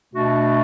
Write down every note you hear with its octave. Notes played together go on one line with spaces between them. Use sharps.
B2 A3 D4 F#4